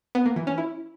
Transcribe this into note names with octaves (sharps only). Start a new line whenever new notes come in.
B3
A#3
E3
C#4
E4